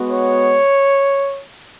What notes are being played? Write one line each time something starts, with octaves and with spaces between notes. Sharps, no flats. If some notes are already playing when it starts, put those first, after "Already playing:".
Already playing: G#3 B3 F#4
C#5